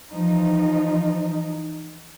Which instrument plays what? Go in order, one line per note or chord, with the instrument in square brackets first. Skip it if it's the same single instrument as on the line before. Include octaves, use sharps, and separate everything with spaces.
[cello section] E3 F3 D#4